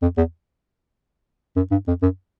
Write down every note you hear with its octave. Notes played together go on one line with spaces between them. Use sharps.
F2
E2
F#2
G2
F2
F#2